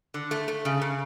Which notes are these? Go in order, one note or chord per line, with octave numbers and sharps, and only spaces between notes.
D3
A3
A3
C#3
C#3